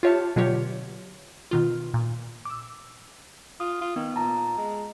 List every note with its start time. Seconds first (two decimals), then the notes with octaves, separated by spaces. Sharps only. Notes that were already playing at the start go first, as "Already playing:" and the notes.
0.03 F4 G4 C#5 E5 A5
0.36 B2 D3 F#3 F4 G4 C#5
1.51 B2 D#3 F4
1.94 A#2
2.45 D6 E6
3.60 F4 D#6
3.81 F4
3.96 D#3 B3
4.16 A#2 A5 A#5
4.57 G#3